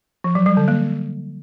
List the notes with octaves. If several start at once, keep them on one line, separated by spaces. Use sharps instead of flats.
F3
F#3
G3
D3
A#3